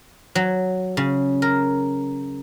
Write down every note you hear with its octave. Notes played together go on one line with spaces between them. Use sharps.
F#3
C#3
A#4